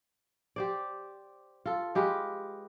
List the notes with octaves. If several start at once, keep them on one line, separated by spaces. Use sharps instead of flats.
G4 C5 D5
F4 A4
G#3 G4 B4 F5